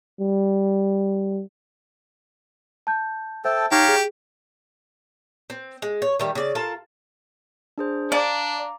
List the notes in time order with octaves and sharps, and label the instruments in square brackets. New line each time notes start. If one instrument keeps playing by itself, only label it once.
[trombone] G3
[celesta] A5 G6
[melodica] A4 G5 A5 [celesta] C5 E5
[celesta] D#4 [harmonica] G4 [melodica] C#5 F5 A#5
[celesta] G#4
[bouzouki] C4
G#3
C#5
D#3 G3 A3
C#3 D5
F4 A4 A#4 A5
[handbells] D4 G#4 C5
[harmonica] D4 [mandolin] D5 [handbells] F5 A#5 D6